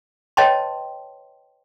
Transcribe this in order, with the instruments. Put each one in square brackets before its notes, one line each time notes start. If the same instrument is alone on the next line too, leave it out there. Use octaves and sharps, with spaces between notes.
[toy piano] B4 C#5 D#5 G5 A5 C6